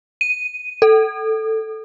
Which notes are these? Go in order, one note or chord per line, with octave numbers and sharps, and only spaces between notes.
D#7
A4